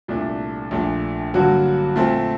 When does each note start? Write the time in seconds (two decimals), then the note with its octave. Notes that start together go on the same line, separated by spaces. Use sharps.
0.08 C2 A#2 A3 D4
0.71 A#1 A#2 A3 D4
1.34 G2 D3 F#3 A#3 F#4
1.96 A#2 A3 C4